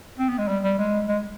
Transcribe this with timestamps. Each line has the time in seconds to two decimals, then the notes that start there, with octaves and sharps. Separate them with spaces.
0.19 C4
0.29 B3
0.38 G#3
0.48 G3
0.63 G3
0.78 G#3
1.08 G#3